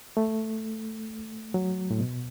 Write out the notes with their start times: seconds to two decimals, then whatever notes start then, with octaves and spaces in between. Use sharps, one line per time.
0.17 A3
1.54 F#3
1.91 A2
2.00 B2